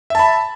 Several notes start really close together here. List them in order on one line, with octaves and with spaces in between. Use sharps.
E5 A5 B5